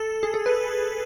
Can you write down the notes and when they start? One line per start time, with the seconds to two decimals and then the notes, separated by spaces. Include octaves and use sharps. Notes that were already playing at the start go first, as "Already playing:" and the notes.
Already playing: A4
0.23 G#4
0.34 A4
0.46 B4